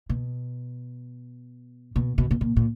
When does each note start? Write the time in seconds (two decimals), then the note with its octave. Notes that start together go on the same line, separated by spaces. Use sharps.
0.09 B2
1.96 B2
2.18 B2
2.31 B2
2.41 A#2
2.56 A#2